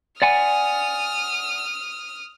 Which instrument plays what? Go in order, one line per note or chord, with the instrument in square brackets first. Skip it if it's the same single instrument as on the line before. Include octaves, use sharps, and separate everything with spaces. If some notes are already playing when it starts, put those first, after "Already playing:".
[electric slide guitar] D5 F#5 G#5 [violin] D#6 F6